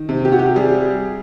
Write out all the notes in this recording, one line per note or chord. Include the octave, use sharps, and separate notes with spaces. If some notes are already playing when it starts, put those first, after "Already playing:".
Already playing: D#3
C3
G4
F#4
G4
G3 G#4